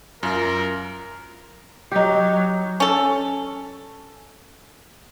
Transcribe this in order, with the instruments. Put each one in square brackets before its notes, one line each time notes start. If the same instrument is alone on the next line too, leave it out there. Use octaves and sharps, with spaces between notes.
[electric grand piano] F#2 F4 [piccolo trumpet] A#4
[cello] F#3 [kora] D#4 G4
[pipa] C#4 A4